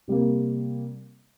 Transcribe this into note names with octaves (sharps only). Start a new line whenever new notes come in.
C3 G3 A#3